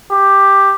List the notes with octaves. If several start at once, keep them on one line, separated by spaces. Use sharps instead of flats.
G4